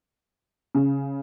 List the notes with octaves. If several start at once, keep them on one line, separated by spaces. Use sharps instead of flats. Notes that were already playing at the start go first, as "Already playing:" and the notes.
C#3